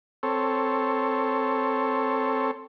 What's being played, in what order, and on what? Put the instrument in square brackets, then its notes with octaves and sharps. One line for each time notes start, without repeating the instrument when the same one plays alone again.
[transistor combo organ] C4 A4 C#5